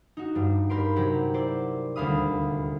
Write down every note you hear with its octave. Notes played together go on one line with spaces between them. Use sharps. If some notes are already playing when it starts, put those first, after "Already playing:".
D#4 F#4
G2 G3
G2 G4 A#4 B5 C6 D7
C3 F#3 G4 F#5 A#5
E4 C5 D5
D#1 D2 G3 F5 B5 D#6